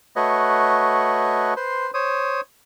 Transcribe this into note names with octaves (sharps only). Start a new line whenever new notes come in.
A3 F#4 B4 C#5 D#5
B4 C5 C6
C5 C#5 D#6